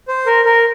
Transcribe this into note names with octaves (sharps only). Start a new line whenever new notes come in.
C5
A#4
A#4